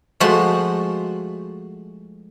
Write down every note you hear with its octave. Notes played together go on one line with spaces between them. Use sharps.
F3 G#3 A3 F#4 C5